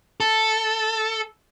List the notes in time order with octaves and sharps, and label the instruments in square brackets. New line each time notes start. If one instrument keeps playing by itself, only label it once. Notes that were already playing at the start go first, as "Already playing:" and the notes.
[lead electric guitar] A4